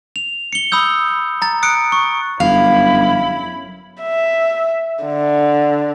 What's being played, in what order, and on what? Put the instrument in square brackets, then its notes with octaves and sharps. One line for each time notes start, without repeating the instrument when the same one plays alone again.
[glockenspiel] F7
C#7 G7
B5 D#6 E6 G6
A#5 A6
D#6 F#6 C#7 D7
C#6
[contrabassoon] G1 [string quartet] F#2 E4 B5 [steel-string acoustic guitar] F5
[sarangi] E5
D3